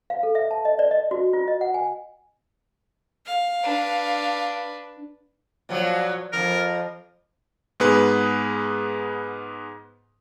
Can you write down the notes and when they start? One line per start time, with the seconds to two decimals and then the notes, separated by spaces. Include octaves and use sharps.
0.10 F5
0.23 A4
0.35 E5
0.51 A5
0.65 D#5
0.79 D5
0.91 D#5
1.11 F#4
1.33 F4
1.48 D#5
1.61 F#5
1.74 G#5
3.26 F5
3.63 D4 B4
5.69 A#2 F3 F#3
6.33 F2 A2 F3 A#4
7.80 G#2 B3 G#4 B4